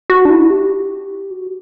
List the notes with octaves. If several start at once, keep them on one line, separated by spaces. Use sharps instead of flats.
F#4
D4
E4
G4
F#4